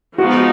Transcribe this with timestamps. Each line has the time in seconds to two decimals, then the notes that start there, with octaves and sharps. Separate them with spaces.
0.18 F3 G#3 B3 D#4 F#4